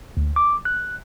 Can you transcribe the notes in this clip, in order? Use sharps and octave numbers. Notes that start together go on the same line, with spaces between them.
D2
D6
F#6